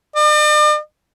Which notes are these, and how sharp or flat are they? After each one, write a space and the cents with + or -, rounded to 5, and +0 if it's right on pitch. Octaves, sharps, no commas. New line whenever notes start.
D5 +45